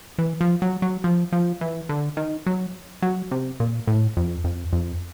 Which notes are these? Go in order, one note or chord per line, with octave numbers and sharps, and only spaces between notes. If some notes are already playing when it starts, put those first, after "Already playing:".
E3
F3
F#3
F#3
F3
F3
E3
D3
D#3
F#3
F#3
C3
A#2
A2
F2
F2
F2